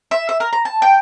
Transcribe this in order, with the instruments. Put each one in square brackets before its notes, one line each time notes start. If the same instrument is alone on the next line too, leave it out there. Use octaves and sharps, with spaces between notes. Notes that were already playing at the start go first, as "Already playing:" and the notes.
[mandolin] E5
E5
A#4
A#5
A5
G5